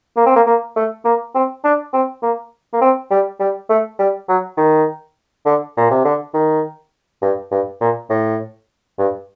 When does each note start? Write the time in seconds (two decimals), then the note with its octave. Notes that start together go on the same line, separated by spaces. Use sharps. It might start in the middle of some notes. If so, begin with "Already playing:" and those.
0.17 A#3
0.26 C4
0.36 A#3
0.46 A#3
0.76 A3
1.05 A#3
1.34 C4
1.64 D4
1.93 C4
2.22 A#3
2.73 A#3
2.81 C4
3.11 G3
3.40 G3
3.69 A3
3.99 G3
4.28 F#3
4.57 D#3
5.46 D3
5.77 A#2
5.91 C3
6.05 D3
6.34 D#3
7.22 G2
7.51 G2
7.81 A#2
8.10 A2
8.98 G2